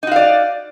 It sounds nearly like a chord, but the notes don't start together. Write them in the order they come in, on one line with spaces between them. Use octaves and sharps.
D#4 F#4 F5 D5